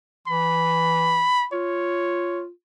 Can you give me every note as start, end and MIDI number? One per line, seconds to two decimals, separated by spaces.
0.27 1.26 52
0.27 1.47 83
1.53 2.49 65
1.53 2.44 73